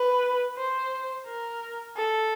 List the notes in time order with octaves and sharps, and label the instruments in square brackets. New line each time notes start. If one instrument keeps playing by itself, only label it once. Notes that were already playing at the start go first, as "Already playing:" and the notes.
Already playing: [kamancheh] B4
C5
A#4
A4